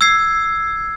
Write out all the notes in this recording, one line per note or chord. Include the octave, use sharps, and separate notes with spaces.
E6 G#6 C7